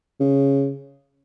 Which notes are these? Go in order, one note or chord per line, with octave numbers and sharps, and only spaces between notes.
C#3